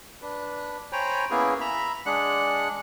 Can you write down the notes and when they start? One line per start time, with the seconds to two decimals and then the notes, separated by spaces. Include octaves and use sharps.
0.22 D4 B4
0.92 C5 C#5 G5 G#5 A#5 B5
1.31 A#3 B3 C#4 E4 G#4
1.60 E5 A#5 B5
2.06 G#3 D4 F#5 F#6